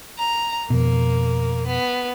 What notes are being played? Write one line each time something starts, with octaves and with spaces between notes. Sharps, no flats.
A#5
F2 B2 A#3
B3